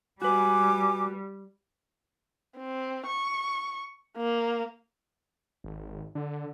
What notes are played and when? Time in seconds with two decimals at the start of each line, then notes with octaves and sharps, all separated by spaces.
0.22 G3 F#4 B4 G#5 D6
2.57 C4
3.07 C#6
4.17 A#3
5.64 G#1
6.15 D3